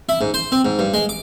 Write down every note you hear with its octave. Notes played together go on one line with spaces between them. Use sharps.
E4
G#2
C5
C4
G#2
G2
G#3
D6